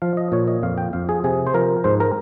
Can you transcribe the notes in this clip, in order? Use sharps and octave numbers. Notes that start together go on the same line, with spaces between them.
F3 F5
D#5
A#2 C#5
D#5
F2 F5
G5
F2 F5
G#4
C3 G#4
C5
F3 A#4
G#2 C5
A#4